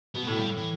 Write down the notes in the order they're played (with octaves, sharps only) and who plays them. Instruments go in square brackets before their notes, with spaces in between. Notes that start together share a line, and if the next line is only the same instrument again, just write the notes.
[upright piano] B2 [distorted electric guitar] B3
[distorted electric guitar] G3
[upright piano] A2 [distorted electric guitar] A3
[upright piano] G2 [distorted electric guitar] G3
[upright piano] A2
[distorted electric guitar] E3